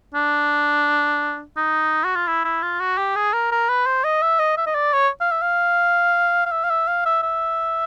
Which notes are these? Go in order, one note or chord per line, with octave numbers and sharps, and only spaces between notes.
D4
D#4
F#4
F4
E4
E4
F4
F#4
G4
G#4
A#4
A#4
B4
C5
D#5
E5
D#5
E5
D#5
D5
C#5
F5
E5
F5
F5
E5
F5
E5
F5
E5
E5